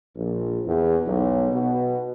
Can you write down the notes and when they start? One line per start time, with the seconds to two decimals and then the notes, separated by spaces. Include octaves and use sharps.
0.16 A#1
0.65 E2
1.07 B1
1.53 B2